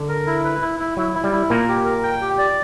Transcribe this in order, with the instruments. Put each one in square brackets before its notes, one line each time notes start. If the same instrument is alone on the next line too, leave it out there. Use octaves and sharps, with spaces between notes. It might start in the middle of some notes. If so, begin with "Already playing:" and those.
Already playing: [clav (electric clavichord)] D3 D4
[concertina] A#4
E4
B4
E4
E4
[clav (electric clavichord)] F#3 [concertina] E4
[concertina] E4
[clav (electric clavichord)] G3
[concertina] E4
[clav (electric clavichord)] A#2 A#3 [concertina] A#4
[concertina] G4
A#4
G5
G4
D5